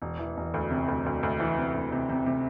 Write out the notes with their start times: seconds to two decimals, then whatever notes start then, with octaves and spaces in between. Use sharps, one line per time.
0.02 E1
0.19 E3
0.37 E1
0.54 D2
0.70 C3
0.88 D2
1.06 D2
1.23 D2
1.40 E3
1.58 C3
1.74 D2
1.92 C3
2.09 C3
2.26 C3